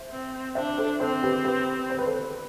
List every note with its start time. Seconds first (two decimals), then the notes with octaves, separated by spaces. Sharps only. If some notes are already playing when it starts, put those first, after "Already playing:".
Already playing: C5 E5
0.11 C4
0.55 D4 C5 E5
0.78 A4 C5
1.00 C4 A4 C5
1.23 G4 B4
1.45 G4 B4
1.90 C5
1.99 B4
2.06 A4 C5